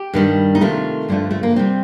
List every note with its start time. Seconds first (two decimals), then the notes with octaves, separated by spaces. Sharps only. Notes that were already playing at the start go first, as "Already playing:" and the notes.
Already playing: G4
0.14 G2 D#3 G3
0.55 D#4
0.61 C3 D#3 A3 F4
1.09 G2 D3 F3 A3
1.31 A3
1.43 A#3
1.56 C3 G3 C4